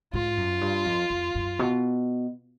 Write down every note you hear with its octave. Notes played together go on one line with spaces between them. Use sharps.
G#2 F4
F#2
G2
F2
F2
F#2
B2